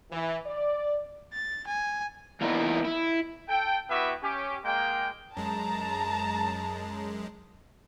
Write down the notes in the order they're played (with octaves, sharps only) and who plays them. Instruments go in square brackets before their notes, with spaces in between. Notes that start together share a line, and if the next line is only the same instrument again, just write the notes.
[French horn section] E3
D5
[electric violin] A6
G#5
[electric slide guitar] E2 A#3 B3 D#4 E4
E4
[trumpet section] A4 G5
B3 E4 F#4 G4 B4 E5
C#4 G4
G#3 A#3 G5
[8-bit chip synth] F#2 G#3 [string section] A5 A#5